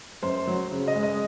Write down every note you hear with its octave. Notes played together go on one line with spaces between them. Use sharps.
F#2 C5
F#3
C#3
D#5
G#3
D#5